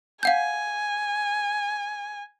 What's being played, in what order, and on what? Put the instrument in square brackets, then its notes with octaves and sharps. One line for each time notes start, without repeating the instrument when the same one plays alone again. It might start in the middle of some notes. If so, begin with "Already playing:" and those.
[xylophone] F5 F#5 G6 [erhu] G#5